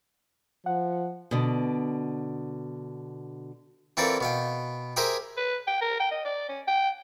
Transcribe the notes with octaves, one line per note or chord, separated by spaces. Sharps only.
F3 F#5
B2 D3
E3 C4 F4 A4 A#4 D5
B2 F5 G5
G4 G#4 A#4 C5 E5 G#5
B4
G5
A#4
G5
D#5
D5
C#4
G5